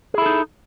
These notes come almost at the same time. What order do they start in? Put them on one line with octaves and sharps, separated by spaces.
G#4 E4 A4 D#4